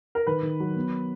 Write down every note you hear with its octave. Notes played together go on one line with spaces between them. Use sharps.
A#4
D#3 B4
D#3
F#3
B3